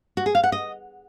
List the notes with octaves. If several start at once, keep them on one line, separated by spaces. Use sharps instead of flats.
F#4
G#4
F5
F#5
D#5